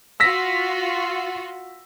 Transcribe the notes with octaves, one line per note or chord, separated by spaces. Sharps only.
F4 F#4 E6 A#6 B6